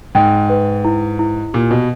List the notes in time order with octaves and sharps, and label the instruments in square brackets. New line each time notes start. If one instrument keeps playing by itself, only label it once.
[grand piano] G#2 [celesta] G5
[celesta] B4
E4
E4
[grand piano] A#2 [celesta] G4
[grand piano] B2